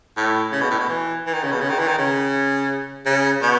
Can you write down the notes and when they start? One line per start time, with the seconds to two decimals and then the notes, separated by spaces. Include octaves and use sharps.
0.17 A2
0.52 C#3
0.61 B2
0.70 A2
0.79 B2
0.89 E3
1.27 E3
1.34 D#3
1.43 C#3
1.52 B2
1.61 C#3
1.70 D#3
1.79 E3
1.88 D#3
1.98 C#3
3.06 C#3
3.42 B2